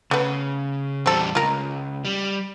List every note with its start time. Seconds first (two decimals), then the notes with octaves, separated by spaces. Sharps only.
0.11 C#3 A3 B3
1.06 E2 G3 C4 A4
1.35 C#2 F4 A#4
2.05 G3